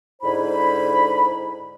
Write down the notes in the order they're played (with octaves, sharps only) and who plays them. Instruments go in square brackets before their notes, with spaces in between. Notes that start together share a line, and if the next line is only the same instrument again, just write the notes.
[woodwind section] G#2 D3 E4 C5 B5